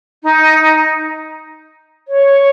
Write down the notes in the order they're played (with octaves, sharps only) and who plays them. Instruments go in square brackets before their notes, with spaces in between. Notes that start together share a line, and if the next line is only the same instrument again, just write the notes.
[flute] D#4
C#5